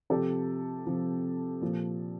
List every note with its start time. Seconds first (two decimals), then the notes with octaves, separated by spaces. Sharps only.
0.10 C3 F3 G4 A4
0.86 C3 F3
1.61 A#2 F3